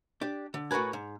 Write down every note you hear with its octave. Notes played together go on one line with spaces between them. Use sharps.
D4 G4
D3
A2 F#4 A#4 B4 G#5
G#2